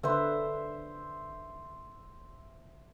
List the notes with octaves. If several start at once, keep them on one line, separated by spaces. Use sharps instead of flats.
D3 B4 C5 E5